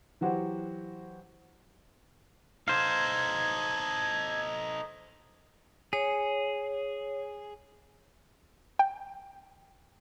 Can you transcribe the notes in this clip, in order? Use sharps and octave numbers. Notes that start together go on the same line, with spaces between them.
E3 F#3 F#4 G4 C5
D#4 A4 C5 F5 G#6
G#4 C#5
G5